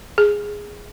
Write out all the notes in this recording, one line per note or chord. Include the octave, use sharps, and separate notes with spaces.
G#4